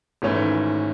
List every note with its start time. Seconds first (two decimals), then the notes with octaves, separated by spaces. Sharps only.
0.22 G#1 G#2 E3 A3 C#4